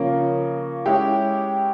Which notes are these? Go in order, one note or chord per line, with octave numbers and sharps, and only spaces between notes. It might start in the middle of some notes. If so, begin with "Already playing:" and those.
Already playing: C#3 F3 A#3 C#4
G#3 C#4 E4 G4